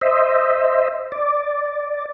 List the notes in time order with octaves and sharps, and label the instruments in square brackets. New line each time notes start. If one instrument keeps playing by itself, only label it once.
[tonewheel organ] C5 D#5 E5
D5